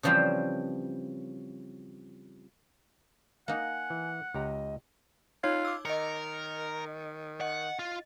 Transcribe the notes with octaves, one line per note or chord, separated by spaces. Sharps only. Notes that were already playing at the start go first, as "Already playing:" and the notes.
C#3 E3 F3 G3 C4
A#3 D#4 F#5 G#5
E3
C#2 G4 D#5 A#5
D#4 F4 C#5 G#6
D6 E6
D#3 A#4 D#5 C#7
D#5 F#5
F4